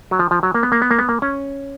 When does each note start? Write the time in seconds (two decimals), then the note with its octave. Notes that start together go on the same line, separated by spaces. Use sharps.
0.11 F#3
0.19 F3
0.31 F3
0.43 F#3
0.54 A#3
0.63 B3
0.72 A#3
0.82 B3
0.91 A#3
0.99 B3
1.09 A#3
1.22 C#4